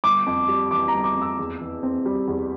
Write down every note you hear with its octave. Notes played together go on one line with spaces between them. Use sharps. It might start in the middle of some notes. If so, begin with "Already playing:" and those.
G1 D6
F2
G3
E3 D6
A#5
G1
D6
F2
E6
E2
E3
C4
G3
E2